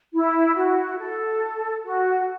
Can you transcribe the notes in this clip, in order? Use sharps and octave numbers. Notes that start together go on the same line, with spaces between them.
E4
F#4
A4
F#4